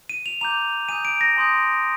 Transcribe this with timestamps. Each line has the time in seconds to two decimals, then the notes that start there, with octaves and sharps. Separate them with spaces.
0.09 D#7
0.26 F7
0.41 A#5 D6 G6 F7
0.89 G#5 D#6 G6 D#7
1.05 D7
1.21 A#6
1.36 G#5 C6 D#6 G6